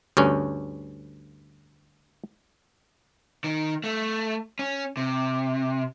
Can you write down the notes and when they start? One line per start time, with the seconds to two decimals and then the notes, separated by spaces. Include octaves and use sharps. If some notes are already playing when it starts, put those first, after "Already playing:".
0.17 D2 G2 C#4
3.44 D#3
3.84 A3
4.59 C#4
4.97 C3